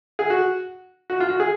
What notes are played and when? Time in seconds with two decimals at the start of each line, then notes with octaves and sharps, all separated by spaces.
0.19 G#4
0.30 F#4
1.10 F#4
1.20 F4
1.30 F#4
1.40 G#4